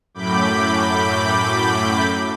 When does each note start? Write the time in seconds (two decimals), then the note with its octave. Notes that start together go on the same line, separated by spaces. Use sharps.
0.14 F#2 A2 B5 D6 G6